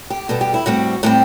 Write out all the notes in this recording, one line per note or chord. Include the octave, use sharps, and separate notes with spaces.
G4
B2 G3 B3 A4
G4
E4
A2 G3 C4 F#4
A2 G3 C4 G4